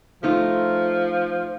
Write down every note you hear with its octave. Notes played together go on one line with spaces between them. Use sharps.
F3 A3 D#4 F4